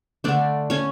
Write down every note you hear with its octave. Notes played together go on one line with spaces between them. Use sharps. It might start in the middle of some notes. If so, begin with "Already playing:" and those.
D3 A3 D4 D5
C#4 C#5